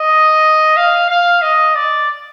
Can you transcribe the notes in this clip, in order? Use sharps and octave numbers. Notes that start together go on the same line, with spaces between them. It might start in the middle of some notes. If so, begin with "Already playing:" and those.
Already playing: D#5
F5
F5
D#5
D5